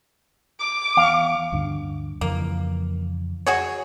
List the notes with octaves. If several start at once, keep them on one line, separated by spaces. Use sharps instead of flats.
D6
E2 F5
D2 G2 D3
F2 C#3 E3 A#3
F#4 G#4 C#5